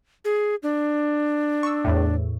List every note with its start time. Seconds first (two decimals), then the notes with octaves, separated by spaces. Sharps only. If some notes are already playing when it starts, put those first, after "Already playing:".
0.25 G#4
0.63 D4
1.63 C#6 E6
1.84 E2 A2